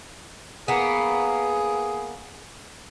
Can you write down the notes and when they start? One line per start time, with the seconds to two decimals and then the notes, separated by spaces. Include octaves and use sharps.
0.68 A#3 B3 G#4